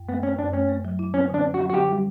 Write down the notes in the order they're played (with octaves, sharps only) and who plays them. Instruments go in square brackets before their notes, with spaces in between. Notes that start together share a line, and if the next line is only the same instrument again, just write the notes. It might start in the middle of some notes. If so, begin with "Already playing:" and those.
Already playing: [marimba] F#2
[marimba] A3 [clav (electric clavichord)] B3
[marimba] A3 [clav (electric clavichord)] C#4
[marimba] F#2 [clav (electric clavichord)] D4
[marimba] A3 [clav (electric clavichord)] C#4
[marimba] A3
F#3
E4
[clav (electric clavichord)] C#4 [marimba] E4
[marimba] D3 [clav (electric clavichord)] D4
[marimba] C#4
[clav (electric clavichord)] F#4
[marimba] F#3
[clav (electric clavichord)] F#4
[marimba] D3 [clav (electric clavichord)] G4
[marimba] G3